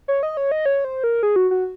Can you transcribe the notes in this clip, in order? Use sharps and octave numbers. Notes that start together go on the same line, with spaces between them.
C#5
D#5
C#5
D#5
C#5
C5
A#4
G#4
F#4
F#4